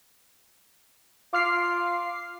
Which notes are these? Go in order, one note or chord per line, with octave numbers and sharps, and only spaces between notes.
F4 D6 F6 C7